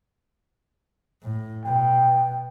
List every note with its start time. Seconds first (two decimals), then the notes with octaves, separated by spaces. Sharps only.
1.22 A2
1.66 B2 G5